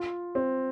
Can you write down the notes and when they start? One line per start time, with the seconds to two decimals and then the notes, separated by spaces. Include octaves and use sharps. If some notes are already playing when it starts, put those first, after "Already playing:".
Already playing: F4
0.35 C4